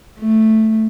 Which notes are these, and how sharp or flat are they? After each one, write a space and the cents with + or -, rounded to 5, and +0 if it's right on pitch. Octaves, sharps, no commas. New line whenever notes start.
A3 +0